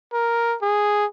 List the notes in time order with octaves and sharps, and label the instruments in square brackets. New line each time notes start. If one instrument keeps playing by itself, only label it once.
[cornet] A#4
G#4